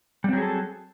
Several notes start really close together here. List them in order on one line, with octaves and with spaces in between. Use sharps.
G3 C4 F#3 G#4 A4